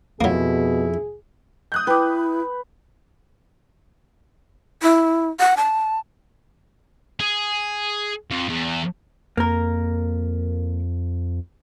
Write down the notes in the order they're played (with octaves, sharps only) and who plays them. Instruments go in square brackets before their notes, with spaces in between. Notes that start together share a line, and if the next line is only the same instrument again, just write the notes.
[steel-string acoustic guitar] F2 E4 [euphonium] B2 [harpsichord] F#3 A#3 [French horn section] G#4
[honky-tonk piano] D#6 F#6 G6
[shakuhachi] E4 [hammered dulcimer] B4 [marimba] G5 D6
[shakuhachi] E4
F#5
A5
[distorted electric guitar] G#4
F2
E2
[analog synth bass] F2 [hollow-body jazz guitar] A#3 A#4